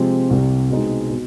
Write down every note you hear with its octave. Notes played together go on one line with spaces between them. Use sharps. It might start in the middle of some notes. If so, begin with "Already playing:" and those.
Already playing: C3 F3 G#3 C4
C2 C3 G3
B2 G#3 C4 D#4
B2